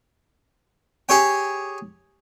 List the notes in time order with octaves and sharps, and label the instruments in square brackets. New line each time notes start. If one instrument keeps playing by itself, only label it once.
[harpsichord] G4 G#4 C#5 G5